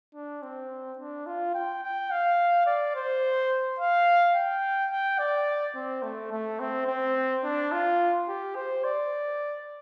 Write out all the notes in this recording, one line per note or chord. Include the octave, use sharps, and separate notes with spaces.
D4
C4
D4
F4
G5
G5
F5
D5
C5
F5
G5
G5
D5
C4
A3
A3
C4
C4
D4
F4
G4
C5
D5